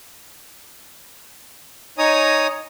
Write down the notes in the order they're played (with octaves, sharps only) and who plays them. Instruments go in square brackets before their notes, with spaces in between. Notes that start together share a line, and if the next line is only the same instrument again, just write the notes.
[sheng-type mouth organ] D#4 C#5 G#5 A#5 D#6